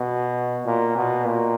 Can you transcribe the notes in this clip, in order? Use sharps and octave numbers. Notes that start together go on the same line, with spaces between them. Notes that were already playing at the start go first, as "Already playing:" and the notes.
Already playing: B2
A#2
B2
A#2